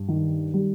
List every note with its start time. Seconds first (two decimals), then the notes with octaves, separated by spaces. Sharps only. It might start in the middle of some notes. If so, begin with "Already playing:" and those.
Already playing: G2
0.08 D#3
0.54 G3